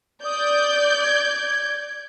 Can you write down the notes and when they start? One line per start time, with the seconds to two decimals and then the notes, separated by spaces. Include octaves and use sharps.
0.25 D5 D#6 G6
1.03 G#6